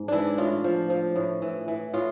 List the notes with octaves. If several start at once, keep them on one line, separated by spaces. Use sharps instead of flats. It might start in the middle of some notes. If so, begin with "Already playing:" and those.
Already playing: G#2
E3 D4 E4
A2 F4
F3
F3
A2
E3
E3
A2 F4